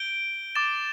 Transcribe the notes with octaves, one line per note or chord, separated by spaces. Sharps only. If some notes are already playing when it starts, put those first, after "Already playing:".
Already playing: G6 D7 G7
D6 A6 E7 G7